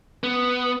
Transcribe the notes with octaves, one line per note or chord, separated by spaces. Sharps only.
B3